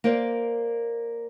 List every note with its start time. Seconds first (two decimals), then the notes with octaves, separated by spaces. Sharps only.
0.04 A#3 A#4 C5 D5